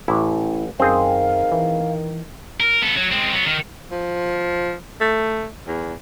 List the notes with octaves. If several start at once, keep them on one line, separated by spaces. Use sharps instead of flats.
A1 E4
F#2 D#3 C4 G#4 C5 F5
E3
A#4
B3 A4
F#3
G#3 C4
F#3 B3
D#3
F3
A3
E2